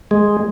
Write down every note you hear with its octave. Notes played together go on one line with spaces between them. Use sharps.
G#3